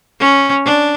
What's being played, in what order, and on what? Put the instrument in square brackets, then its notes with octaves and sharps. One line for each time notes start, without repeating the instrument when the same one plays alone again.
[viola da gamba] C#4
D4